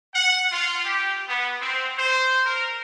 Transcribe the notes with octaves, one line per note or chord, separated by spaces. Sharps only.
F#5
F4
G4
B3
C4
C5
A#4